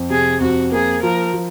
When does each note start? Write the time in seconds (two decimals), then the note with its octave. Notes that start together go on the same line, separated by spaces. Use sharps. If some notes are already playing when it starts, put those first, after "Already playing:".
Already playing: F2
0.10 C3 G#4
0.40 F2 F#4
0.72 A#3 G#4
1.02 F3 A#4
1.34 F3